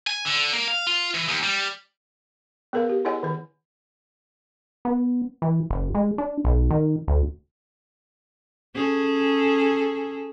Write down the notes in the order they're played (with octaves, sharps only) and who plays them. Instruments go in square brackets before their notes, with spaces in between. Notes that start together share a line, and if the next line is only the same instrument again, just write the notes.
[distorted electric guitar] G#5
D3
A#3
F5
F4
E3
D#2
G3
[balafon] B3 G#4 A#4 B4 F5
G4
E4 G#4 C#5 D#5 F#5 G#5
D#3 B4
[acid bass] B3
E3
F#1
G#3
D4
B1
D#3
D2
[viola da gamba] C#4 G#4 A4